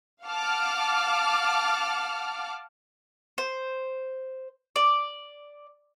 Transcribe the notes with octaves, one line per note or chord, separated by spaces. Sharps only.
F5 F#5 A5 D6 F6
C5
D5